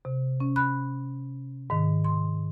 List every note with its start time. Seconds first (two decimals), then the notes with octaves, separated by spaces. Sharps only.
0.05 C3
0.40 C#4
0.56 B5 F#6
1.70 G#2 D#3
2.04 C6